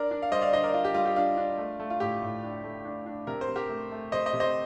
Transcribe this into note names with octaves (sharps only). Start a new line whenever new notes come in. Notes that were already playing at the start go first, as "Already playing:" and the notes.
Already playing: D4 A#4 D5
D4
F5
G3 C5 D#5
D5 F5
D4 C5 D#5
A#4 D5
D4 F4
G4
G3 F4
G4
D4 F4
D4
A3
A3
F4
A2 G4
A2
D4
A3
D4
D4
C3 A#4
C5
C3
G4 A#4
A3
A3
C3 C5 D#5
C5 D#5
C3
C5 D#5